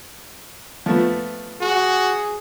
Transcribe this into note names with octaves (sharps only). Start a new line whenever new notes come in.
F3 A3 B3
F#4 G#4